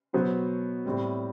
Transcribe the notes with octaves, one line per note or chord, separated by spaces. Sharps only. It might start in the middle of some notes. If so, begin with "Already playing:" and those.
B2 F#3 B3 F#4 C5
A2 G3 C4